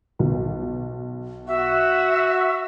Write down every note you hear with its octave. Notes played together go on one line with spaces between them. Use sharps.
B1
F#4 E5